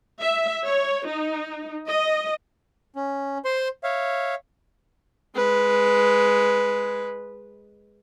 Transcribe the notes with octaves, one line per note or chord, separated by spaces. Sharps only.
E5
C#5
D#4
D#5
C#4
C5 C6
C#5 E5 F5
G#3 B4